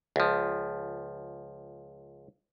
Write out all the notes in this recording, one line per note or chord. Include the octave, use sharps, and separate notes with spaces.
C#2 F3